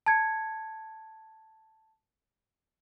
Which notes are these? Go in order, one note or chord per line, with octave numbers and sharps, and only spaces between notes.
A5 G#6 C#7